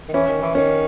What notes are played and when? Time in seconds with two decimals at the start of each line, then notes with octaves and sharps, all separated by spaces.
0.08 D#3
0.13 E3 C#4
0.28 D#3
0.42 E3
0.55 D#3 C#4